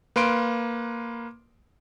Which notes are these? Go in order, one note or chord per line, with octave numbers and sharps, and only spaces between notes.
A#3 B4 F5 C6 D7